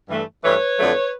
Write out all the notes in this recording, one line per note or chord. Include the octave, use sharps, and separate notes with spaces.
G2 E3 A3
G2 E3 A3 B4 C#5
F2 D3 F#3 A3